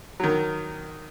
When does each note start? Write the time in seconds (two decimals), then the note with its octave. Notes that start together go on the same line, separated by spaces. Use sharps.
0.20 D#3 F#3